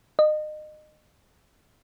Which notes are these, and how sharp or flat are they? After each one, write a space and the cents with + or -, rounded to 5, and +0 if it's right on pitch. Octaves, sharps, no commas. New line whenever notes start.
D#5 -30